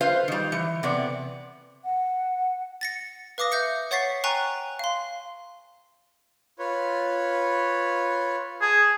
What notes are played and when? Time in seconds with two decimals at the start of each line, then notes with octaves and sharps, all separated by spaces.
0.01 F4 B4 C5 F5
0.28 D#3 G3
0.52 E3
0.83 C3 B3 D5
1.83 F#5
2.81 A6 A#6 C#7
3.38 B4 F5 D6 D#6 A#6
3.52 E5 G6 A#6 C#7
3.91 C#5 F#5 C#6 A6 B6 C7
4.24 G5 G#5 A#5 C#6 F#6
4.79 F5 C6
6.59 F4 B4 C#5
8.61 G#4 A5